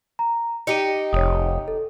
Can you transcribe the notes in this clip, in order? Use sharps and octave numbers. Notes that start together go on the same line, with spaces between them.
A#5
D#4 G4 C#7 D#7
F1 C#5 D#6
A4